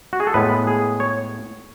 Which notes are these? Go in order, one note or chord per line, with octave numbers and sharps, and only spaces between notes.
F#4
G#4
A4
A2 G#3 B3 B4
G#4
C#5